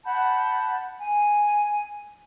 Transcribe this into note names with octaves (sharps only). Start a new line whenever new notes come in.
F#5 A5 B5 G6
G#5